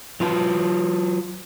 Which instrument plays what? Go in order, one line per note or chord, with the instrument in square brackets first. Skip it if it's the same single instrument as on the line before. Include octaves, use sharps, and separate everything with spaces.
[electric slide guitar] F#3 F4 B4 G#5 A5